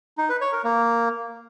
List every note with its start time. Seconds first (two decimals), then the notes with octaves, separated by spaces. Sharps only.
0.18 D#4
0.29 B4
0.41 C#5
0.53 A#4
0.64 A#3